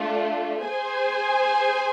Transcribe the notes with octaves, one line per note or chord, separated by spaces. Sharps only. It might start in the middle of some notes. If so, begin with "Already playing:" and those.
Already playing: A3 D4 F4
G#4 C5 G#5